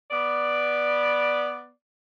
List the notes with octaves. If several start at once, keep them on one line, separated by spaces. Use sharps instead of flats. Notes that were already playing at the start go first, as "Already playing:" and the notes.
B3 D5